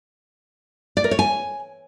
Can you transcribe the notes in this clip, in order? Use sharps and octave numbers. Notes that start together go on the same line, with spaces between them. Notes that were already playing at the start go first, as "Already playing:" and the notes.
D5
A#4
C#5
G#5